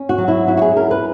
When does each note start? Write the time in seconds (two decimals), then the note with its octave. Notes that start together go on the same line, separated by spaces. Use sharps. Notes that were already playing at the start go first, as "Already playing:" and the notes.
Already playing: C#4
0.09 F#4
0.18 F#3
0.28 E4
0.47 E4 F#4
0.57 F#4
0.62 G#4
0.77 C#4 A#4
0.91 B4